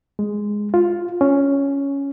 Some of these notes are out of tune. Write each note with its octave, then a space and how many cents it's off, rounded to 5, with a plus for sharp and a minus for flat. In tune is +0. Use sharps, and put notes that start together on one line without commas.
G#3 +0
F4 +5
C#4 +5